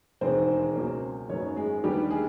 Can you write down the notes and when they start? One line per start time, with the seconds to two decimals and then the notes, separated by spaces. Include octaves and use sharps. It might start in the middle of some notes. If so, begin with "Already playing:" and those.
0.21 E1 D#2 D#3 G#3 C4 C5
0.75 C#2 B2 F#3 A#3 C#4
1.29 G#1 F#2 D#3 F#3 B3 C#4 C#5
1.56 G#3 G#4
1.84 D#2 D3 G3 B3 G4
2.11 G#3 G#4